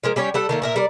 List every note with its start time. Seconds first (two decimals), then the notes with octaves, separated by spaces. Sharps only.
0.04 F3 G#3 A#3
0.16 G3 C#4 G4 C#5
0.34 G3 A4 F#5
0.49 D#3 A3 A#3
0.62 A#2 A#4 E5
0.76 G3 A#4 D5